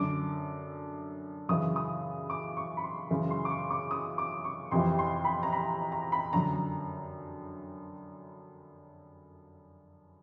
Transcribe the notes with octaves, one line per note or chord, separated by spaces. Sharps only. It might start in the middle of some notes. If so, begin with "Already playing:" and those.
Already playing: F#2 D3 D6
F#2 C#3 E3 D#6
D#6
D6
C#6
B5
C6
F#2 C#3 E3
C6
D6
C#6
D6
D#6
D6
C#6
F2 C3 E3 C6
C6
B5
A#5
B5
A#5
B5
F#2 D3 A#5